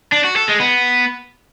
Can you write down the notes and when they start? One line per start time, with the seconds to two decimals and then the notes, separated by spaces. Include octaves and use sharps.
0.12 D4
0.24 F#4
0.36 A4
0.48 G#3
0.60 B3